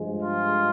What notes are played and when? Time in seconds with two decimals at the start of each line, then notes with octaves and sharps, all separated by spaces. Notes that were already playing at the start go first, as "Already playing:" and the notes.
Already playing: G2 F3 G#3
0.23 F4